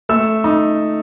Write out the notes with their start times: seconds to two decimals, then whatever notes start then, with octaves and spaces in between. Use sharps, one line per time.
0.09 A3 E6
0.44 D#4